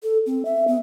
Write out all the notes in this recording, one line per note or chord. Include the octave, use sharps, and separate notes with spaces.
A4
C4
E5
B3